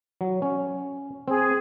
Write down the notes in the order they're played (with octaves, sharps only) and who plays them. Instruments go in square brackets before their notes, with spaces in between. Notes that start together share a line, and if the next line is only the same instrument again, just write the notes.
[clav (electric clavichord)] F#3
C#4
[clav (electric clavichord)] C4 [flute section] G#4